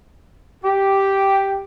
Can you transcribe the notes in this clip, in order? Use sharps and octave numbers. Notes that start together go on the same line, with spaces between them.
G4